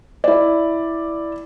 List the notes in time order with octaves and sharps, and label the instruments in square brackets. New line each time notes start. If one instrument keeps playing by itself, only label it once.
[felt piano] E4 D5